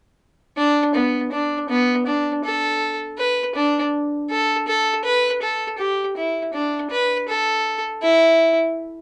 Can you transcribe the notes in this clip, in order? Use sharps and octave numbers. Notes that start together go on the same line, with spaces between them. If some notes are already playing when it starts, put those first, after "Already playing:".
D4
B3
D4
B3
D4
A4
B4
D4
A4
A4
B4
A4
G4
E4
D4
B4
A4
E4